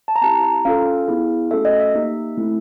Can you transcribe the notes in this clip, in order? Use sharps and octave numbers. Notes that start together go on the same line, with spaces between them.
A5
A#5
C4 E4 G4 A5
A#5
C#4 F4 A4 F5
B3 E4 G#4
A3 C#4 F#4 A4 E5
D#5
E5
A#3 D#4 G4
A3 C4 E4